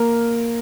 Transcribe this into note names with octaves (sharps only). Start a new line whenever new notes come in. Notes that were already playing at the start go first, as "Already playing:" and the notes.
Already playing: A#3 A#4